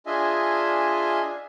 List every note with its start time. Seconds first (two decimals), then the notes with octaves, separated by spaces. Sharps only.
0.06 D4 F4 G#4 D#5 E5 G#5